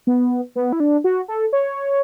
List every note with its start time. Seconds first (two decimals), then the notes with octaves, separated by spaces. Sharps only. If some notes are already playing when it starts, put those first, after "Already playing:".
0.07 B3
0.55 B3
0.72 E4
0.80 D4
1.04 F#4
1.28 A4
1.53 C#5